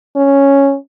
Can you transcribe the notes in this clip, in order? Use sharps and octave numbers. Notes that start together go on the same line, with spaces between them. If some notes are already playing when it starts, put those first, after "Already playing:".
C#4